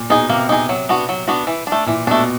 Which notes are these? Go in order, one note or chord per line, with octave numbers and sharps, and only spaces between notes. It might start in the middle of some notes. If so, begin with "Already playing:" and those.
Already playing: A#2
B2 D#4 G#4
C3 A#3
D#4 G#4
F#3
B3 D4 F#4
F#3
B3 D4 F#4
E3
D4
A3
A#2 E3
B2 A3 D4